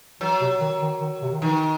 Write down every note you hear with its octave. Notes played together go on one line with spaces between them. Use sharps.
E3 F#3
C3
D#3
D#3
D#3
C3
D#3
D#3 E3